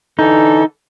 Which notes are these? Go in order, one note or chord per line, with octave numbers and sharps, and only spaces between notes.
D3 E3 D#4 A4